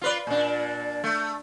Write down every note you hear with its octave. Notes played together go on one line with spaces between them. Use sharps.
F4 B4 D5
A#2 D4
A3